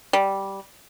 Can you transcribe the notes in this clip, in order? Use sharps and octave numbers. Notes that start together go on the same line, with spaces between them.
G3